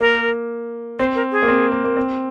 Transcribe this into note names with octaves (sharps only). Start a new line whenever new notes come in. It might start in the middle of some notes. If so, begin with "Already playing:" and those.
A#3 A#4
C4 C5
A#4
G#4
A#3
C4
A#3
A#3
C4